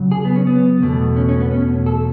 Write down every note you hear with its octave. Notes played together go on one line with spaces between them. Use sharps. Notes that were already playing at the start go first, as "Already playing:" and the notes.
Already playing: C#3 F#3
G#4
B3
C#4
B3
E2 B2 A3
C#4
C#4
B3
C#4
A4